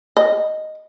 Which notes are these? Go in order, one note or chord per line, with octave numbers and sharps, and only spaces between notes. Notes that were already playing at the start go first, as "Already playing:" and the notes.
D#5